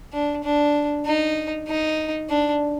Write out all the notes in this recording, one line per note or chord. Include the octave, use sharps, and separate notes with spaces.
D4
D4
D#4
D#4
D4